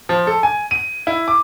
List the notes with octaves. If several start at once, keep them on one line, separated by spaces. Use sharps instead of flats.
F3
A4
G#5
D#7
E4
D6